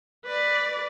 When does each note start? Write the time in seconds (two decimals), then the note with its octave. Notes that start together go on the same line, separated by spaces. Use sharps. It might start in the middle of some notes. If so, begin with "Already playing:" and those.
0.25 B4 D5